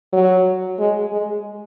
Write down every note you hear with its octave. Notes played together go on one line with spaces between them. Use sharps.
F#3
G#3
G#3